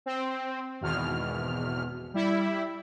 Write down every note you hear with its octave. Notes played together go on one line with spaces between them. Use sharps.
C4
G#1 E2 B2 F6
G3 E4